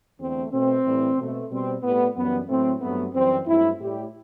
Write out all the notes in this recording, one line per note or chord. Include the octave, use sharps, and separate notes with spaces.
E2 D3 A3 C4
B2 A3 C4
A2 E3 G3
B2 A3
B2 G3 C4
A2 G3 B3
F#2 E3 G3 B3
A2 F#3 A3 C4
G2 F#3 A3 B3
F#2 E3 G3 C4
G2 F#3 A3 E4
A2 G3 G4